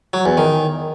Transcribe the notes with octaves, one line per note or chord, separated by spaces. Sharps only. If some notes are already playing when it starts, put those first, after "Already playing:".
F#3
E2
D#3